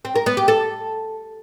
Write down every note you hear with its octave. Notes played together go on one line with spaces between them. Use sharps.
C4
A#4
B3
G4
A4